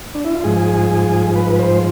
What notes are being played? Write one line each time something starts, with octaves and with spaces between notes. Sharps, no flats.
D4
E4
F4
G#2 F3 G#4
B4
C5